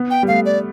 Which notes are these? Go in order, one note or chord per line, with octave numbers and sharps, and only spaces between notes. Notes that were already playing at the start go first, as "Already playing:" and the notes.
Already playing: B3
G5
G3
A3 F5
D5